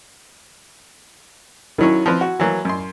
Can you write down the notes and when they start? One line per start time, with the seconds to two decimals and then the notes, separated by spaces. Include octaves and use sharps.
1.78 D#3 F#3 C#4 E4
2.06 F3 C4 B4
2.21 F#4
2.40 E3 F#3 A#3
2.65 F#2 C6